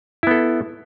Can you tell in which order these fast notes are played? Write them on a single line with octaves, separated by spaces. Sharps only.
E4 B3 A4